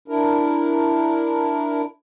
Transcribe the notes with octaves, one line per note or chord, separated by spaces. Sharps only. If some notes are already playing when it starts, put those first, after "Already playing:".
D4 E4 A#4